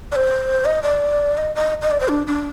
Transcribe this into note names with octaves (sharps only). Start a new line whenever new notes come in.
D5
C5
D#5
D5
D#5
D#5
D#5
D5
C5
D4
D4